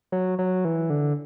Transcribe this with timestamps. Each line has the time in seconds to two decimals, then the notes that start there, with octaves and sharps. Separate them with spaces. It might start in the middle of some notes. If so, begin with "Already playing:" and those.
0.12 F#3
0.39 F#3
0.65 E3
0.90 D3